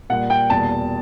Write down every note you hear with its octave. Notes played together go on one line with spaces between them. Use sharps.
A#2 G3 A#3 F#5
G5
E2 B2 G3 A#3 A5